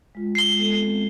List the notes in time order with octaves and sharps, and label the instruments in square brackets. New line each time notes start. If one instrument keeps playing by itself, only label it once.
[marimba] G#3 F4
[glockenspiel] C7 G7
[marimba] G#3 B3 A4
C4